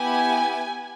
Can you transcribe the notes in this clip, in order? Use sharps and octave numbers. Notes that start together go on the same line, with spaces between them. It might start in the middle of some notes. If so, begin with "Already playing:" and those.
Already playing: B3 E4 G4 G#5